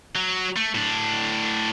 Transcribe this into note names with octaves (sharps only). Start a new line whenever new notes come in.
F#3
A3
A2 D4